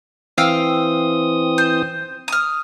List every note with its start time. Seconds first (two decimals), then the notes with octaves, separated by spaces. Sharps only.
0.38 E3 C4 F5 G5 D#6 E6
1.58 C5
2.28 D#6 F6